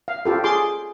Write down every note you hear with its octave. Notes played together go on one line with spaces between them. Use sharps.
F5
F4 G4 A4
G#4 C6 D6